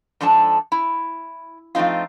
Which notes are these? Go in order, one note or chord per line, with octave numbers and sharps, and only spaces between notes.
G#2 F3 D4 A4 A5
E4
F3 A3 C4 D#4 F4